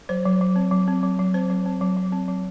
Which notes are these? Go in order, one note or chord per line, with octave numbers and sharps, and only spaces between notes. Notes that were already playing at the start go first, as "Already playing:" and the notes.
F#3 C5
F#3
F#3
C4
F#3
C4
F#3
F#3
C4 C5
F#3
C4
F#3
F#3
C4
F#3